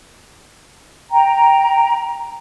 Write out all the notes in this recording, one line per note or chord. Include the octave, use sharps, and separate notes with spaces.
G5 A#5